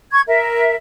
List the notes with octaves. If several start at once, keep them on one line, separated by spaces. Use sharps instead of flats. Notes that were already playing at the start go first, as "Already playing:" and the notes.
C#6 G#6
A#4 E5